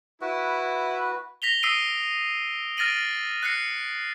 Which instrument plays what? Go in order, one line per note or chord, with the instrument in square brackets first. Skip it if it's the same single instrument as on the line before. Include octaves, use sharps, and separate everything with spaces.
[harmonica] E4 [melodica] F#4 B4
[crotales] A#6 B6 F7 G7
D#6 E6 B6 C7 D7 D#7
F6 A6 A#6 D7 D#7 F#7
F#6 A#6 C7 C#7